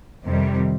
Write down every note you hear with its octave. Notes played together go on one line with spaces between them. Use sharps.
F2 C3 D#3 G3